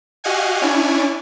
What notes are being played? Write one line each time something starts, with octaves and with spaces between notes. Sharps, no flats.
F#4 G4 D#5 F5 F#5 G#5
C#4 D4 E4 C#5 D5 G#5